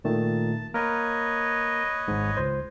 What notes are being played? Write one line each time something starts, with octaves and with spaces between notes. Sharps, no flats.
A#2 D#3 A3 A5
A#3 A#4 B4 C#5 D#5
G#1 G#2
C#2 C5